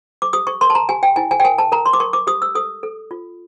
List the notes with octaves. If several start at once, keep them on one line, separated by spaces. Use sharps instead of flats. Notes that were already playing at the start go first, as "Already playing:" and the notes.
D6
G4 D#6
C#6
A#4 C6
A5
A#5
G4 G#5
G5
E4 G#5
G#5
G5
A#4 G#5
A5
A#4 A#5
C6
D6
A#4 C#6
D6
G4 D#6
E6
A4 D#6
A4
F4